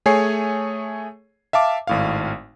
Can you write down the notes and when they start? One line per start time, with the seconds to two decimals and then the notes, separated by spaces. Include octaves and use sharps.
0.06 A3 G#4 C#5 G#5 C7
1.53 E5 F5 A5 D6
1.87 G#1 A2 F5